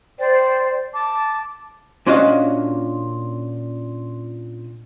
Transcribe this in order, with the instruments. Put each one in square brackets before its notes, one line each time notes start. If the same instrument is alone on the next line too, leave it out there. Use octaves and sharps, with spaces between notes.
[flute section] C5 D5 G5
A5 D6
[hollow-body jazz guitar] A#2 C#4 D4 F#4 D#5 F5